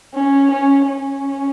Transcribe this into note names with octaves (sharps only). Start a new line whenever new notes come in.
C#4
C#4
C#4